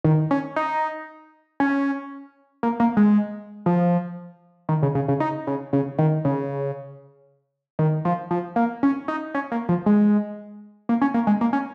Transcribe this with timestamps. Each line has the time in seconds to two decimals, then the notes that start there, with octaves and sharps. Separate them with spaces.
0.04 D#3
0.31 C#4
0.56 D#4
1.60 C#4
2.63 A#3
2.80 A#3
2.97 G#3
3.66 F3
4.69 D#3
4.83 C#3
4.95 C#3
5.08 C#3
5.20 D#4
5.47 C#3
5.73 C#3
5.99 D#3
6.25 C#3
7.79 D#3
8.05 F3
8.31 F3
8.56 A#3
8.83 C#4
9.08 D#4
9.34 C#4
9.52 A#3
9.69 F3
9.86 G#3
10.89 A#3
11.01 C#4
11.14 A#3
11.27 G#3
11.41 A#3
11.53 C#4